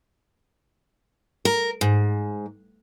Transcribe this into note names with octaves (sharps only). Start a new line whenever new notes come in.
A#4
G#2